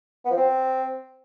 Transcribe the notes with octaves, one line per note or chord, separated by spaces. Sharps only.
B3
F3
C4